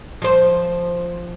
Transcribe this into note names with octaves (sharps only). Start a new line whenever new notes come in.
F3 C5